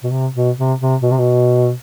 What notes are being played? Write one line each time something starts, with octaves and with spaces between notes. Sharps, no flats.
B2
C3
B2
C3
C3
B2
C3
B2